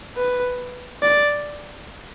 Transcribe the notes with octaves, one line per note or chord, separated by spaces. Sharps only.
B4
D5